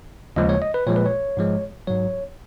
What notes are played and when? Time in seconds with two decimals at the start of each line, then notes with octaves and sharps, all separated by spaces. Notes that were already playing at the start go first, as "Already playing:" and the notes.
0.36 D#2 C#3 F3 G#3 D#5
0.49 C#5
0.62 D#5
0.74 B4
0.87 A#2 F3 G#3 C#5
0.96 B4
1.06 C#5
1.37 G#2 F3 G#3
1.87 G#2 F#3 C#5